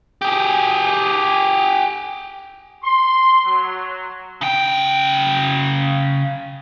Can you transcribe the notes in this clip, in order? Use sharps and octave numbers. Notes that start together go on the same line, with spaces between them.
G4 G#4
C6
F#3
C#3 G5